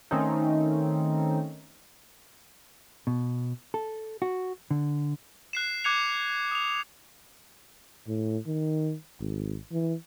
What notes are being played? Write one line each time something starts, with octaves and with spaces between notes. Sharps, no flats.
D#3 A3 C4 C#4 D#4
B2
A4
F#4
D3
F#6 C7 E7
D6 F#6 G#6 C#7 F7
D#6 F7
A2
D#3
G#1
E3